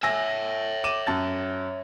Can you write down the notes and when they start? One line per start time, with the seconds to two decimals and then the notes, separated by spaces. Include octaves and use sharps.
0.03 C#5 E5 G#5 E6 A#6
0.84 D6 D#7 E7
1.07 F#2 A5 A6